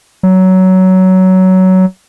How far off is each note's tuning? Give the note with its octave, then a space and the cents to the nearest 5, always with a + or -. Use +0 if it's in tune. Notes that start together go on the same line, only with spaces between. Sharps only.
F#3 +15